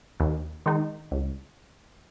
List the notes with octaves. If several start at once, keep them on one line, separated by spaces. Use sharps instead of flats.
D#2
D#3 G#3 D#4
C#2